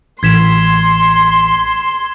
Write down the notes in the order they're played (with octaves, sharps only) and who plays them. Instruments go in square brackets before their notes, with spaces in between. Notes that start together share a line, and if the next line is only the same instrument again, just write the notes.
[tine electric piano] A1 [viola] C6 [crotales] G#6 B6 E7